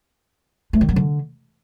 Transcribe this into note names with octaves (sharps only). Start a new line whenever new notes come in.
A3
D#3
F#3
D3